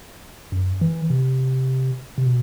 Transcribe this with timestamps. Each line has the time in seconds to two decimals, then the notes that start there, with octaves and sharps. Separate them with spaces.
0.52 F#2
0.81 E3
1.10 C3
2.18 C3
2.26 B2